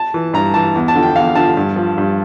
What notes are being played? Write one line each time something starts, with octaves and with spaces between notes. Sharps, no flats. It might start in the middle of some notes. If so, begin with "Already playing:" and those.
Already playing: A5
E3
G2 A#5
E3 A5
E2
A5
D3 F3
G5
E2 F5
D3 F3 A5
G2
F3
G2